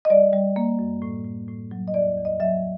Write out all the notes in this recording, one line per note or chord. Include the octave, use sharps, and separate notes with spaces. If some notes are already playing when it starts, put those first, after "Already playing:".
D#5
G3 D5
G3
A#3
F#2
A2
A2
A2
F#3
D#5
E2 D5
E2
D#5
F#3 E5